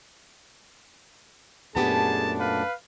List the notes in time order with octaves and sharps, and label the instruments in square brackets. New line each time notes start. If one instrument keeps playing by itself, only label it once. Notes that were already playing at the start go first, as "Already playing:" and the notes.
[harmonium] F#2 A3 D4 [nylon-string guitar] A#2 B3 G4 [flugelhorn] G#4 [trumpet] A5
[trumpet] B4 [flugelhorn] F5